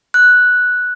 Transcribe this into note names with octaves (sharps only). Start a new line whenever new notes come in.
F#6